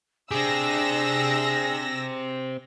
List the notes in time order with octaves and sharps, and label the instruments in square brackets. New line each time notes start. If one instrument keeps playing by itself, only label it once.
[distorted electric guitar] C4 G4 [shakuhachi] D4 [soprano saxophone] G#4 [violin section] E6 A#6